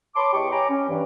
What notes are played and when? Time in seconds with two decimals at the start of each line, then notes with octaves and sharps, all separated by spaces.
0.16 C#5 A5 B5 C6 D6
0.33 E2 G4 D#5 C#6 D6
0.51 C#5 G5 G#5 A#5 B5 D6
0.69 C#4
0.89 G2 E3